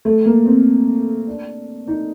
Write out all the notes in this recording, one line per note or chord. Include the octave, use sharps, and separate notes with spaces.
A3
A#3
C4
D4
D#4